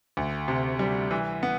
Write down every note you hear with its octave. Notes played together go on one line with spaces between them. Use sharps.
D2
C3
G3
E3
B3